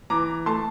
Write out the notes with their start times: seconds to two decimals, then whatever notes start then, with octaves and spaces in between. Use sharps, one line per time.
0.10 E3 A#5 D6
0.46 A3 A5 C6